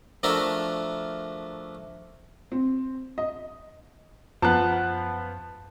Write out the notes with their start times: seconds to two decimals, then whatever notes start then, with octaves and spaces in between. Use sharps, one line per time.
0.23 F3 A3 D4 F#4 A#4 E5
2.52 C4
3.18 D#5
4.42 F#2 F3 B3 C5 F#5 A5 F#6